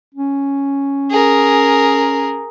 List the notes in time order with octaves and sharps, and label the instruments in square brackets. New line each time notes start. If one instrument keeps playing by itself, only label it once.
[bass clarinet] C#4
[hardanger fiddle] G#4 A#4